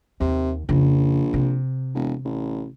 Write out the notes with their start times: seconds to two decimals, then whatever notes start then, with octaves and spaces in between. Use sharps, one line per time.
0.20 D#2 C3
0.69 A#1 F2 C#3
1.34 C3
1.95 E1
2.25 A1